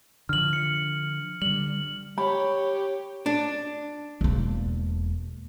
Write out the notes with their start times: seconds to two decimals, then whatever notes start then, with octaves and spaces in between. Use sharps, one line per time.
0.29 D3 F3 F6 F#7
0.53 C#7
1.42 D3 G3 F#7
2.18 G4 C#5 B5
3.26 D4
4.21 E1 A#3